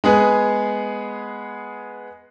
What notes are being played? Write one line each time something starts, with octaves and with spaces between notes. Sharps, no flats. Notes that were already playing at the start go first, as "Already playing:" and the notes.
G#3 B3 G#4